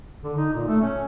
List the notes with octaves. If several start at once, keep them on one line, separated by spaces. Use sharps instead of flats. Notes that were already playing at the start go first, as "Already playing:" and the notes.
D3
D#4
A#2
A3
C#4